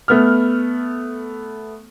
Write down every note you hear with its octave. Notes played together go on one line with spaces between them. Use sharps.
A3 B3 F6